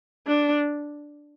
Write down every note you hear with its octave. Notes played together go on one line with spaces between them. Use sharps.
D4